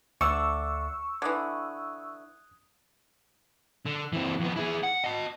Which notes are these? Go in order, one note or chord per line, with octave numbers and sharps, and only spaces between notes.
D2 D3 A3 D4 C#6 E6
D3 E3 D#6 F#6 G#6
D3
E3 C4
F2 B3
E4 G#4
F#5
D#5 A5